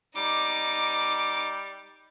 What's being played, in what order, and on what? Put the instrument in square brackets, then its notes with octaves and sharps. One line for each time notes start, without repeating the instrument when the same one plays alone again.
[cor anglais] G3 [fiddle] D#4 D6